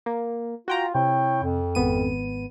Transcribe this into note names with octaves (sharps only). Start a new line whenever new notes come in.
A#3
F4 F#4 G5 A#5
C3 E4 C#5 G5
F2
G#1 B3 D#7